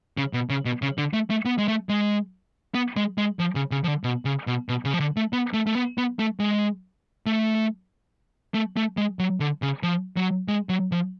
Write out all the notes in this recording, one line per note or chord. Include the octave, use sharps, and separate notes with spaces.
C#3
B2
C#3
B2
C#3
D3
A3
A3
B3
G#3
A3
G#3
B3
G#3
G#3
F3
C#3
C#3
F3
D3
B2
C#3
B2
B2
C#3
F3
D3
A3
B3
A3
A3
B3
B3
A3
G#3
A3
A3
A3
G#3
F#3
D3
C#3
F3
F#3
G#3
F#3
F3